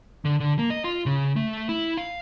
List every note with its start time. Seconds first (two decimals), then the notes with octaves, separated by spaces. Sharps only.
0.25 D3
0.40 D3
0.59 A#3
0.70 D#5
0.84 F4
1.06 C#3
1.36 A3
1.69 E4
1.97 F5